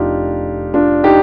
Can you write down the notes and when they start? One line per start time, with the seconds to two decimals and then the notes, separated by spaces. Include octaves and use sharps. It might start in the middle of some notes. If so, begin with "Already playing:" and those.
Already playing: F1 F2 D4 D#4 F4 G4
0.74 D4 F4
1.03 D#4 G4